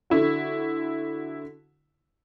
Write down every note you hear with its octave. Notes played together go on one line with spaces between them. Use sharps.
D3 E4 F#4